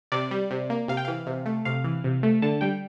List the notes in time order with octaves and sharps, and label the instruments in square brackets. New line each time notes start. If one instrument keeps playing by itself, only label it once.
[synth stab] C3 D5
G3
C3
A#3
C3 F5
G5
E3 F5
C3
A3
C3 F5
E3
C3
A3
D3 A5
G3 G5